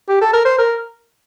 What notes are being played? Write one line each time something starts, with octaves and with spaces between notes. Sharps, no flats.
G4
A4
A#4
C5
A#4